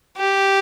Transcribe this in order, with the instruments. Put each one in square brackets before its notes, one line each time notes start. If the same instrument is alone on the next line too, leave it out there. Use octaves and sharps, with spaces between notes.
[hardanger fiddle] G4